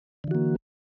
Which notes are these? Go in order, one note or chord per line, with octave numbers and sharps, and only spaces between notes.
D3 E3 A#3 F#4